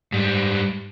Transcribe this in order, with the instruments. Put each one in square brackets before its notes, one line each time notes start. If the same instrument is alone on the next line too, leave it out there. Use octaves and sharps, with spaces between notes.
[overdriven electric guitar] G#2 G3